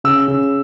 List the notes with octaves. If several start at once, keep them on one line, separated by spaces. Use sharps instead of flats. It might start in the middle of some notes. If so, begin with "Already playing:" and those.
C#3 E6
C#3